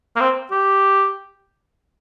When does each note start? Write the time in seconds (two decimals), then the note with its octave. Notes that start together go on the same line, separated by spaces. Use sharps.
0.16 A#3
0.20 C4
0.51 G4